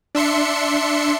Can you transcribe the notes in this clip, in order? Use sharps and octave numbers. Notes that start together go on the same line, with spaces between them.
D4 E5 C6 C#7